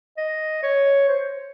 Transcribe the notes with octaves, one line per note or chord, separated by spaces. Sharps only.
D#5
C#5
C5